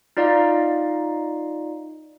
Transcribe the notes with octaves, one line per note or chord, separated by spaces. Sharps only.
D#4 F4 D5 D#5 F5 A#5